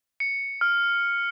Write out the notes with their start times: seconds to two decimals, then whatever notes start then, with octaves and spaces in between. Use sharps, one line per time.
0.20 C#7
0.61 F6